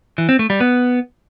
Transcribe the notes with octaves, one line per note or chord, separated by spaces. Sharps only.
E3
C4
A3
G3
B3